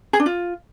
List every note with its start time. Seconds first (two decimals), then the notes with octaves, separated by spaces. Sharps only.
0.13 G#4
0.20 D4
0.26 F4